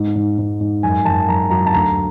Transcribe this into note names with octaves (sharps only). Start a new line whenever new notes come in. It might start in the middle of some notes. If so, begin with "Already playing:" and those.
Already playing: G#2
G#2
G#2
G#2
F#2 G#5
F#2 A5
F#2 A#5
F#3 A#5
A5
D2 A#5